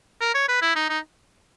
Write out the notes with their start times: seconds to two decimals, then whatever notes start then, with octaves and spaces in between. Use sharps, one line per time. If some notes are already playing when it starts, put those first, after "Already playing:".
0.21 A#4
0.34 C#5
0.49 B4
0.62 E4
0.76 D#4
0.90 D#4